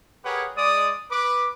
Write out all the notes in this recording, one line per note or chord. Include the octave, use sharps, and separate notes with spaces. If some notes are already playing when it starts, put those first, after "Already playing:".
G4 G#4 A#4 B4 C#5 F#5
G#3 D5 D#6
B4 D6